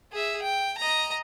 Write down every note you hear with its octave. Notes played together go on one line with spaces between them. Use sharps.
G#4 E5
G5
D#5 A#5